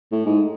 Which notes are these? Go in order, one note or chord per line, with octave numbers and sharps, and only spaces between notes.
A2
G#2